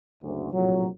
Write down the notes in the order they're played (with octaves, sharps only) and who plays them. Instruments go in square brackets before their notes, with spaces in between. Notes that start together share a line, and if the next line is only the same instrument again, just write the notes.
[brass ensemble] F#1 D2
A#1 A2 C3 F3 F#3